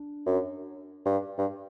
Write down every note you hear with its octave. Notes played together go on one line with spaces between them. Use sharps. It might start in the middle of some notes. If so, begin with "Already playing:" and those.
Already playing: D4
F#2
G2
G2